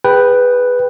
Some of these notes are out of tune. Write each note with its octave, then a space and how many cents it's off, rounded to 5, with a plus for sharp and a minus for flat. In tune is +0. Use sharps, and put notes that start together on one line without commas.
G#4 -25 B4 +0 G5 +0